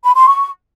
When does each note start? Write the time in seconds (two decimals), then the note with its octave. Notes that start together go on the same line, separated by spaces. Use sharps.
0.03 B5
0.15 C6
0.27 C#6